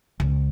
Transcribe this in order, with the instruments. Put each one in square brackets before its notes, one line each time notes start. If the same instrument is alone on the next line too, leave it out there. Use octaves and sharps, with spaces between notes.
[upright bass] C#2